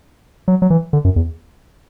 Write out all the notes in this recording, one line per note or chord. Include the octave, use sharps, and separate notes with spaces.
F#3
F#3
E3
D3
F#2
E2